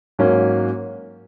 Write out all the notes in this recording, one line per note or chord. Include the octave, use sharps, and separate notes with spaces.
G#2 F#3 A#3 C#4